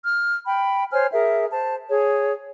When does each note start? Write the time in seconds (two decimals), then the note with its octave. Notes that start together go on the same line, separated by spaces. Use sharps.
0.03 F6
0.45 G5 B5
0.92 C5 C#5 G#5 F6
1.12 G#4 A#4 E5
1.52 C5 A5
1.88 G#4 C#5